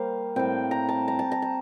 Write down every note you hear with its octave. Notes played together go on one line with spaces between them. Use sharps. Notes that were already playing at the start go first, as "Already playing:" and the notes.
Already playing: G3 A#3 C5 F5
A2 G3 C4 G5
A#5
A5
A#5
A5
A#5
A5